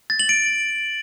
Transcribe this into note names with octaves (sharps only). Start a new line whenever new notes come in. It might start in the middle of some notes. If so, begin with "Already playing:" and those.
A6
F#7
D7